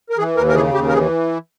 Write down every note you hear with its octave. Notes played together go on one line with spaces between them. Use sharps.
A#4
E3 G#4
D#2 A#4
A#4
C#3 G#4
D#2 G4
A#4
E3 G#4